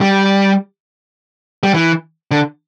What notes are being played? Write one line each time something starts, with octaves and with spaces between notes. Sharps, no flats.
G3
G3
E3
D3